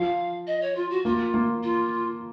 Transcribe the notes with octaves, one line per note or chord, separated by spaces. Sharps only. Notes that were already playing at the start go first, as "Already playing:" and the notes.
Already playing: F3 F5
D#5
C#5
F4
F#4
A#3 F4
A#3
F4